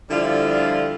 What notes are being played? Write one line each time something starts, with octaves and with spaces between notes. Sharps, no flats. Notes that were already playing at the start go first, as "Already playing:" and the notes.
D3 F3 G3 E4 F4